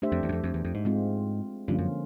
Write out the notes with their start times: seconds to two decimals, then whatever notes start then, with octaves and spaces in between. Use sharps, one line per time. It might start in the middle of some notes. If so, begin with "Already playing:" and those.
0.02 A3 D4 G4 C5 E5
0.12 F2
0.23 E2
0.29 F#2
0.32 F2
0.44 F2
0.54 E2
0.65 F2
0.75 G#2
0.85 G#3 C4 F4
1.68 G2 D3 F3 A#3 C#4 F4
1.79 F#2